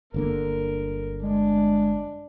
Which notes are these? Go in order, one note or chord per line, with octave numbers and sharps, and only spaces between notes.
G1 D3 A#3 A#4
G#3 D4